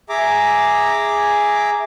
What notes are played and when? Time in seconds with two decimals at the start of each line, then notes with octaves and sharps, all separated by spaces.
0.09 G#4 E5 A#5 D6